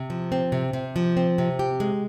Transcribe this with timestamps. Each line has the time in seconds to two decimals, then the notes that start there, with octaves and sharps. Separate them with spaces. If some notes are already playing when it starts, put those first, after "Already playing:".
Already playing: C3
0.10 F3
0.32 C4
0.52 C3
0.73 C3
0.96 F3
1.17 C4
1.38 C3
1.59 G4
1.80 G#3